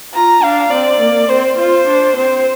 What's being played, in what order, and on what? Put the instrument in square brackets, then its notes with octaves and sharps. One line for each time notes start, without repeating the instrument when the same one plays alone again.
[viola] F4 [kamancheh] A#5
[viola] D4 [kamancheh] F5
[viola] C4 [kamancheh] D5
[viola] A#3
[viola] C4 [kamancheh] C5
[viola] F4 [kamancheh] C5
[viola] D4
[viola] C4 [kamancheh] C5